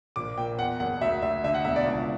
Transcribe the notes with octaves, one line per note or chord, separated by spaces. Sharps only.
A#1 D6
A#2 G5
E2 F#5
F#1 F#5
D2 E5
D2 E5
D3 E5
F#5
E1 E5
D5
C#2